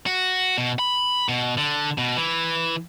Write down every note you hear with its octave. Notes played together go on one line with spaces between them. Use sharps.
F#4
B2
B5
B2
D3
B2
E3